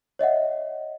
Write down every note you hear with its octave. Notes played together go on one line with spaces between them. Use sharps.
C#5 D#5 E5 F#5